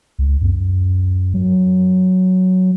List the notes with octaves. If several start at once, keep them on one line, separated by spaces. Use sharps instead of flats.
C#2
F#2
F#3